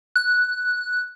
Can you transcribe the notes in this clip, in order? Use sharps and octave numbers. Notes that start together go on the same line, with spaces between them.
F#6